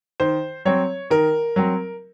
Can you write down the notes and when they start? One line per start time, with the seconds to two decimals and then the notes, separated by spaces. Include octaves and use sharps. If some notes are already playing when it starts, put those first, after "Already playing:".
0.20 D#3 C5
0.65 F#3 C4 C#5
1.10 D#3 A#4
1.56 F#3 C4